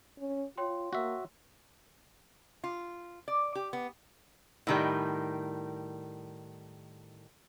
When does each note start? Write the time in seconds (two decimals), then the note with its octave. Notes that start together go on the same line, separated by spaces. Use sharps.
0.19 C#4
0.57 F4 C#5 G5 C6
0.93 A#3 F#4 E5
2.64 F4
3.28 D5
3.55 G4
3.73 B3
4.67 A2 D#3 G3